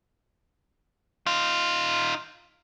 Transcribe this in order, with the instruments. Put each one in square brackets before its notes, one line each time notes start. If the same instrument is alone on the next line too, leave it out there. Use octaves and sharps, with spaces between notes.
[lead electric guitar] D#4 F4